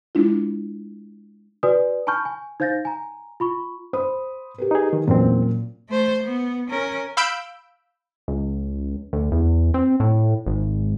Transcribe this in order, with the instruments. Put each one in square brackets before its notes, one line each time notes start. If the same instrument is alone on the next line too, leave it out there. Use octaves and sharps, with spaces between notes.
[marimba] G#3 D4 E4 F4
[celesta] F#4 B4 D5 G#5 D#6
G#5 A5 B5 C#6 F6 G6
G#5
D#4 C5 F5 G6 A6 A#6
G#5 A#5
F4 B5 C#6
[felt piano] C5 B5 D#6
G4 A#4 B4
[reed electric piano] D#4 G#4
D#3
[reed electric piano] E2 C4 [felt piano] A#2 F#3 C#4
[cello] A3 C5
B3
C#4 A#4
[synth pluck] F5 B5 E6 G6 D7
[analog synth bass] C#2
D2
E2
C4
A2
G#1